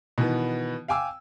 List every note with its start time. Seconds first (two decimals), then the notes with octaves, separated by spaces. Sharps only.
0.18 B2 D#3 E3 B3
0.88 F5 G5 G#5 D6 E6